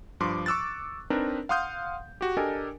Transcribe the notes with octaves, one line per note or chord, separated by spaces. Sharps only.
G2 F3 C6 D6
C#6 D6 E6 F#6 A6
C4 D4 D#4 A#4 B4
F5 F#5 C6 D#6 F6 G6
F#4 G4
D4 G4 A4 A#4 D#5 G#5